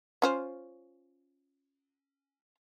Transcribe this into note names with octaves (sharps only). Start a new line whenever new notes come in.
C#4 F4 C5